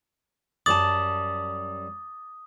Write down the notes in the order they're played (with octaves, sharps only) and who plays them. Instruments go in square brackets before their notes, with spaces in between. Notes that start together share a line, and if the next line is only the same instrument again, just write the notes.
[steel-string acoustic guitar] F#2 G3 A5 [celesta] D6 A6 F#7 [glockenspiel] D#6